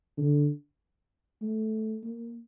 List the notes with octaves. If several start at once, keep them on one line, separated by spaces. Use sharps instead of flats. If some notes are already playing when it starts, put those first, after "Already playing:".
D3
A3
A#3